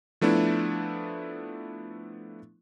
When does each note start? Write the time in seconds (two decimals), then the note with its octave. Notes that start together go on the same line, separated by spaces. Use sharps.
0.21 F3 A3 B3 D4 E4